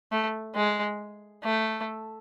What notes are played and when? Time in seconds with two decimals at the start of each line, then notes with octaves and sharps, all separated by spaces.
0.12 A3
0.56 G#3
1.44 A3